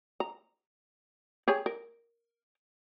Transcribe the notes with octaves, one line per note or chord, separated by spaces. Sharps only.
A#5
G4 G#4 C#5
A#4